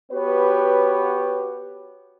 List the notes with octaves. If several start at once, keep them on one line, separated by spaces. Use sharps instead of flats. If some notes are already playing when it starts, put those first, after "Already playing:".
B3 F#4 G4 B4 C#5